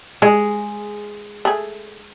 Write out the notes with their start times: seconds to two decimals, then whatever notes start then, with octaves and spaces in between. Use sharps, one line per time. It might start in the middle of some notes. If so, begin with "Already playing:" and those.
0.22 G#3 G#4
1.45 A3 G#4